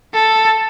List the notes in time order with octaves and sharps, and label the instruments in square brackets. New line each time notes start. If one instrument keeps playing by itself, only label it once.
[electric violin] A4